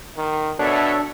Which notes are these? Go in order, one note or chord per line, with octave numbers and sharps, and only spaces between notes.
D#3
B2 D4 A4 C#5 E5